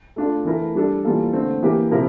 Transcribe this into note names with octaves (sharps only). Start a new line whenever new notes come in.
A3 D4 F4 A4
E3 A3 E4 A#4
G3 D4 A4
E3 G3 A#3 F4 A4
D3 A3 C4
E3 A#3 E4 G4 A#4
C3 F3 C4 E4 A#4